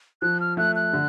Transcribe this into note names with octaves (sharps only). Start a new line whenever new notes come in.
F3 F#6
F6
A3 F#6
F#6
D3